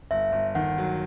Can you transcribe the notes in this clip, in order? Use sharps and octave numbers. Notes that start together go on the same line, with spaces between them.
G1 E5
G1
D#3 F#5
F#3